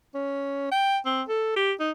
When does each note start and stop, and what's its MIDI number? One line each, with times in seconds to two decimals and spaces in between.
0.14 0.68 61
0.71 0.98 79
1.05 1.23 60
1.28 1.56 69
1.56 1.73 67
1.80 1.91 63